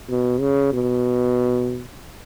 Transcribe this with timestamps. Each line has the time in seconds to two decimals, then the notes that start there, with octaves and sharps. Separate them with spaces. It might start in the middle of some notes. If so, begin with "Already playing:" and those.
0.10 B2
0.40 C#3
0.73 B2